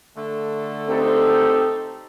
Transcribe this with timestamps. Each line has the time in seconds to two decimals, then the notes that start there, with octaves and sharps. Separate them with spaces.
0.16 D3 A3
0.88 C4 D#4 G4 A4